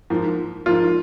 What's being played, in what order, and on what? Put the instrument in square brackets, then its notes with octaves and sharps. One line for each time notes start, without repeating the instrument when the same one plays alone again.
[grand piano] G#2 F3 A#3
[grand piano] G#2 F3 A#3 [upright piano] F4